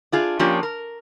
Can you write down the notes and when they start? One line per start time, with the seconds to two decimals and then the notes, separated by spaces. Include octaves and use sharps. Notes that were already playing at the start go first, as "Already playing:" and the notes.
0.12 D4 F4 G#4
0.39 F3 A#3 C#4 D4 F4 G4
0.63 A#4